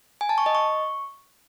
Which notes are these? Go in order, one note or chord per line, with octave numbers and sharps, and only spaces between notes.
G#5
A5
C#6
D#5
C#6